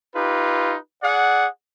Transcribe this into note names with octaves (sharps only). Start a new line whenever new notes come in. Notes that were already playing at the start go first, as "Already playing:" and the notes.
D#4 F4 G4 B4
G#4 D5 F#5